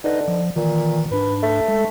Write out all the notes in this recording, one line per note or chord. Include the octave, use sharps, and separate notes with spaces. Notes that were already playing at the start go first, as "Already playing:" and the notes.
D3 D#4 B4 D#5
F3
A#2 D#3 E3
G#2 D4 B4
A3
G#3 A4